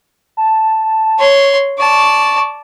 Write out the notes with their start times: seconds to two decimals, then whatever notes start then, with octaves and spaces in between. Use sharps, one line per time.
0.37 A5
1.19 C#5 C6
1.78 D5 A5 C#6